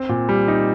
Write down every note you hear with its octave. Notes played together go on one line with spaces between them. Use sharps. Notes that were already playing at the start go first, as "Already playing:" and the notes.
Already playing: C4
A#2
G3
D#4